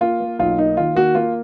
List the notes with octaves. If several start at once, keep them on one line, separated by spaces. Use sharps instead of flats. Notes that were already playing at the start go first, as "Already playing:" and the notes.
A#3 F4
A#3
B1 F4
A#3 D#4
D#3 F4
A#3 F#4
A#3 F4